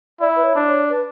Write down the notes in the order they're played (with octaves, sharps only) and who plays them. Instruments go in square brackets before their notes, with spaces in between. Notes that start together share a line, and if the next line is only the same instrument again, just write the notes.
[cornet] E4 [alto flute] D5
[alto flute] B4
C#5
[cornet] D4
[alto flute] C#5
B4